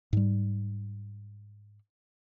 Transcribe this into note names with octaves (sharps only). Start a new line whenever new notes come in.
G#2 G3